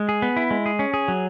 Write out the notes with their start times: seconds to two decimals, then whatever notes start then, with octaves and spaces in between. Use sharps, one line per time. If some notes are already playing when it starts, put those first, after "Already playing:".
Already playing: G#3
0.09 G#4
0.22 B3
0.37 E4
0.51 G#3
0.66 G#4
0.79 C#4
0.94 G#4
1.08 F#3